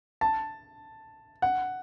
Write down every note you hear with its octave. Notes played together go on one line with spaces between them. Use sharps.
A5
F#5